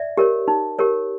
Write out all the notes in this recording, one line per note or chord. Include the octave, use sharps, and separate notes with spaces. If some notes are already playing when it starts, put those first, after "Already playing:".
Already playing: D5 E5
G4 A#4 C#5
D#4
G4 A#4 C#5